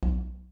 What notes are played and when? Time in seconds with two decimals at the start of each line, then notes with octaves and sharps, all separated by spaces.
0.03 B1